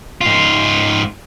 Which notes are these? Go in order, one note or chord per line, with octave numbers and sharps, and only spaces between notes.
G#2 F4